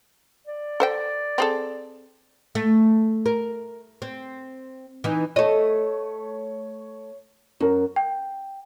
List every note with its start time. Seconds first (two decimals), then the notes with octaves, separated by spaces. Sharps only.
0.47 D5
0.80 A4 C5 G5
1.38 C4 G#4 A4
2.55 A3
3.26 A#4
4.02 C4
5.04 E3 D#4
5.36 A3 C#5 D#5
7.60 F#2 C#4 A#4
7.96 G5